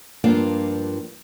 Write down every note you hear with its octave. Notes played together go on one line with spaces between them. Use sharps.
G2 F3 A#3 D4 F4